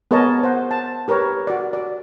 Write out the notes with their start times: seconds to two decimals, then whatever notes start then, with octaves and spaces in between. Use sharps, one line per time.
0.11 B3 G#4 A#4 C#5 D#5 A5
0.43 C5 F#5
0.71 A5
1.08 G4 A#4 B4 C#5
1.47 F#4 D5
1.73 D5